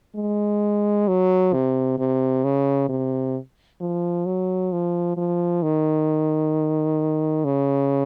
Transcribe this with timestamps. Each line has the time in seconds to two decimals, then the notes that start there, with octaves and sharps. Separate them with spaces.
0.15 G#3
1.08 F#3
1.53 C3
1.98 C3
2.44 C#3
2.89 C3
3.81 F3
4.26 F#3
4.72 F3
5.17 F3
5.63 D#3
7.44 C#3